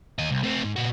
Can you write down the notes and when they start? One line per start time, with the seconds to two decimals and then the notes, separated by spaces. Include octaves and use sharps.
0.19 D#2 D#5
0.31 C2
0.43 A3 C4
0.64 G#2
0.76 A#2 F#4